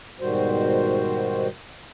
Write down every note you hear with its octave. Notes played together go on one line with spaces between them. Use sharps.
G#2 B2 D#3 G3 F#4 C5